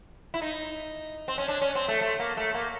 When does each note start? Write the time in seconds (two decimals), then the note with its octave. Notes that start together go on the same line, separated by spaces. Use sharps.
0.34 E4
0.42 D#4
1.28 C4
1.38 C#4
1.48 D4
1.61 C#4
1.75 C4
1.88 A3
2.01 A3
2.19 A#3
2.37 A3
2.54 A#3